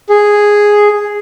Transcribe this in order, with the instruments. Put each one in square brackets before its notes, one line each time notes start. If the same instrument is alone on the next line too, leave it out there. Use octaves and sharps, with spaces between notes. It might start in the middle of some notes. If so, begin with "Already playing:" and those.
[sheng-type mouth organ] G#4